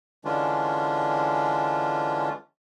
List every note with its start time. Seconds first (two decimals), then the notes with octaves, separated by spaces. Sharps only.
0.25 D3 E3 G#3 C#4 D4 F4